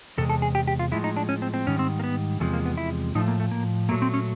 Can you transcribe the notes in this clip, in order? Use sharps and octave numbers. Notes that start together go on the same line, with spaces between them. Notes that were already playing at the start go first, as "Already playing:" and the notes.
E2 C3 G#3 A4
A4
G#4
G4
G4
F4
A2 F3 G#3 E4
D#4
D4
C#4
C4
C4
G#2 D#3 G3 C#4
C4
A#3
B3
E2 C3 F3 G#3 A3
A#3
B3
E4
A2 F3 A3 D#4
A#3
A3
A#3
A#2 F#3 A3 A#3
C4
C#4